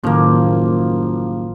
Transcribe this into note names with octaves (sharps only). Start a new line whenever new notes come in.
F#1 A2 D#3 F3 A#3